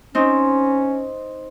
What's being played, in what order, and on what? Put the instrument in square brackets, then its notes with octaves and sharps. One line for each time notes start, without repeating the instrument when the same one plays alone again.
[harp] C4 D#4 [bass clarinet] C#4